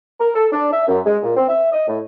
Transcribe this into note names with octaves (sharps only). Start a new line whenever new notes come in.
A#4
A4
D4
E5
F#2
G#3
A#2
C4
E5
D#5
A2